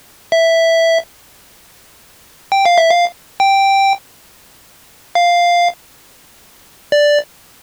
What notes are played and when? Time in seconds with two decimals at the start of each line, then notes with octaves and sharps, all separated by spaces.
0.32 E5
2.52 G5
2.66 F5
2.78 E5
2.91 F5
3.40 G5
5.15 F5
6.92 D5